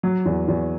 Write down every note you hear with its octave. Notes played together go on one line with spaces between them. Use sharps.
F#3
E2
E2